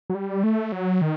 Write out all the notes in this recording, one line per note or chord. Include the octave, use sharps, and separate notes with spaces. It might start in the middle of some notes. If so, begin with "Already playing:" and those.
F#3
G3
A3
F#3
D#3